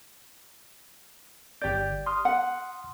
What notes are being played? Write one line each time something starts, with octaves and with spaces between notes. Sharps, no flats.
G1 G4 D5 G6
C6 D#6 F6
F#5